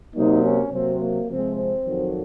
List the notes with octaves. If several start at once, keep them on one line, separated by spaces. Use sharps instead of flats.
C3 F#3 A#3 D#4
C#4
C3 F#3 A#3 C4
A#3
C3 F3 G#3 C4
C4
F2 D#3 F#3